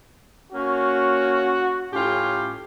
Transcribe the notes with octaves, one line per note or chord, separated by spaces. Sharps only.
A#3 C#4 F#4
A2 C#4 F4 G4